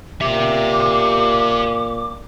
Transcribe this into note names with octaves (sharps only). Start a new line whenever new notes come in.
A#2 G4 E5 D6